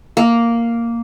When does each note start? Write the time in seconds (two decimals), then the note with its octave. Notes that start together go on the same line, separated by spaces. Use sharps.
0.17 A#3